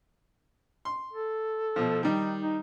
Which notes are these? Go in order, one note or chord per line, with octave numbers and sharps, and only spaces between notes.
C6
A4
B2 F3
D#3 G3 D#4
D#4